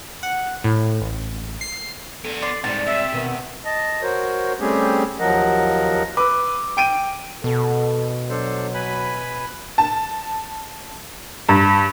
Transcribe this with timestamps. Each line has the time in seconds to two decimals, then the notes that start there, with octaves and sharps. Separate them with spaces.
0.23 F#5
0.64 A2
1.01 A1
1.61 C7
2.24 B3 D4 A4 G#5
2.42 D5 C6
2.64 G#2 C3 D#3 G3 A5
2.86 C3 E5
3.12 B2 D#3 B3
3.65 D#5 A5
4.02 F#4 A#4 C5 C#5
4.60 G3 A3 C4 C#4 G4 G#4
5.19 D#2 F3 F#3 A#4 D#5 F#5
6.17 B4 D6 E6
6.77 G5 D7 D#7
7.44 B2 A4
8.29 F#3 D4 A4 C5
8.74 B4 G#5 B5
9.78 A5
11.49 G2